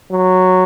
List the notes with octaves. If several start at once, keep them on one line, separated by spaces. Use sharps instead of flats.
F#3